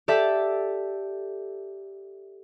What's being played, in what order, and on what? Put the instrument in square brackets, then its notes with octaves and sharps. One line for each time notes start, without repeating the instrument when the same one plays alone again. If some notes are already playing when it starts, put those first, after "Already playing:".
[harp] G4 A4 D5 E5